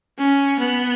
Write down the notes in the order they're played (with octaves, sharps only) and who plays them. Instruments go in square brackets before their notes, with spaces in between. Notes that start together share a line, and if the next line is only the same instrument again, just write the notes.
[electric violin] C#4
B3